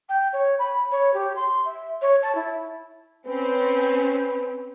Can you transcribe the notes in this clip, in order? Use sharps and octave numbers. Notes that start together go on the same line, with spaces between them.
G5
C#5
B5
C#5
G4
C6
E5
C#5
A5
E4
C4 C#4 B4